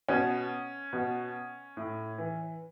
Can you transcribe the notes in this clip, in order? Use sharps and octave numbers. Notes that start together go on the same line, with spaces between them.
B2 C#4
B2
A2
E3